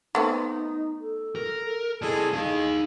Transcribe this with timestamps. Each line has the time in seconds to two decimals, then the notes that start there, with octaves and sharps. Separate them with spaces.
0.15 A3 B3 C4 D#4
1.01 A4
1.36 A#4
2.02 G3 E4 G#4 A4 D#5
2.33 D#4 G#4 F5